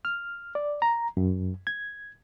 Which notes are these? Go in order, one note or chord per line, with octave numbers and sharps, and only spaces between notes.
F6
D5
A#5
F#2
G#6